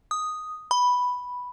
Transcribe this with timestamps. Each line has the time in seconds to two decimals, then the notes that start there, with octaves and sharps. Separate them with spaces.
0.11 D#6
0.71 B5